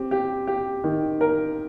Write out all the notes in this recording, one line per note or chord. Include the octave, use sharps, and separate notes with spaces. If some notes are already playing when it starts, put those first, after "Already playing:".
Already playing: C4 G4
G4
G4
D#3
A#4